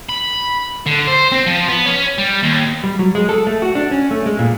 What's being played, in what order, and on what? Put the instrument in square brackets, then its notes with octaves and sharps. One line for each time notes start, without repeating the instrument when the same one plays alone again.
[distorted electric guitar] B5
D3
C5
C4
F3
B3
C#4
G3
D#2
[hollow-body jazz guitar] G3
F#3
G#3
A4
A3
F#4
D4
C#4
A3
G#3
A#2